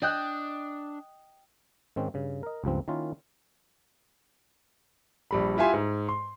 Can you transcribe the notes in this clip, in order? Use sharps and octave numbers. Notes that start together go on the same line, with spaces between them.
D4 D#5 G5 F#6
G#2 D#3 C4 C#4
G2 C#3
A#4 D#5
C#2 G2 F3 C4
D#3 A#3 C#4 E4 F4
A#1 G3 B5
E4 F4 G4 E5 G#5 C6
G#2
C6